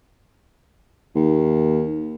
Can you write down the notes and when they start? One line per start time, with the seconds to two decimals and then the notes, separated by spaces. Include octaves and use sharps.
1.15 D#2